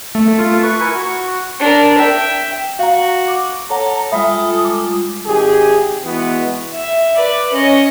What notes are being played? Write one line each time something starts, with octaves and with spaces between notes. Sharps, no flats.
A3
F4
B4 C#6
E4 A#4 G#5
F#4
D4 A#4
E5 G5
F#4 F5 A#5
D6
A4 C#5 F#5 A#5
G3 G#3 F4 E5 B5 D#6
D6
G#1 G4 G#4
E3 G#3 B3 F#4
E5
B4 D5
C#4 D#5